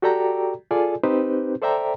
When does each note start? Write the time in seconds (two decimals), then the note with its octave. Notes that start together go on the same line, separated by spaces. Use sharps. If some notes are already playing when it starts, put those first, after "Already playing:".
0.02 F#4 G4 A4 D5 G5 A#5
0.71 F4 G#4 A4 D5 G#5
1.03 C4 D#4 G4 B4 C5
1.62 A4 C5 D5 E5 G5 A#5